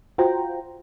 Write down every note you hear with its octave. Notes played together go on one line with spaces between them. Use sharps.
F4 F#4 C5 G5 A#5